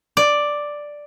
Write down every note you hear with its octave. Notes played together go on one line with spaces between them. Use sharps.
D5